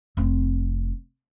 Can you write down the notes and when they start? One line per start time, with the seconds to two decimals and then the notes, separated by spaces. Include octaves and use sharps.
0.17 F1 C4